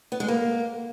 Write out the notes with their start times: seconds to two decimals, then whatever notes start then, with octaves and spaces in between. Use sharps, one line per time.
0.12 B3
0.20 G#3
0.28 A#3